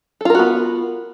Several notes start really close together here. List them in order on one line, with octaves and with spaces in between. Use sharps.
A4 F4 A#4 F#4 B3